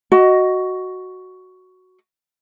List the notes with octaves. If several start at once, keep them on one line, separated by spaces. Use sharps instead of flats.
F#4 D#5